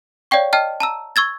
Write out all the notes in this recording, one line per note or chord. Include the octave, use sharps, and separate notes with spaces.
C#5 D5 F5 G5 C#6
D#5 G5 A5 F6
A5 A#5 E6
C#6 E6 G#6 A6